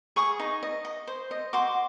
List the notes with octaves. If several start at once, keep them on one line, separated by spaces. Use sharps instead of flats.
G#4 C#6 D#6
D#4
D#5
D#5
C5
D#5
F#4 C6 D6